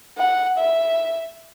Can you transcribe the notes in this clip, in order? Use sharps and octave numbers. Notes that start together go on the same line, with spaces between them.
F#5
E5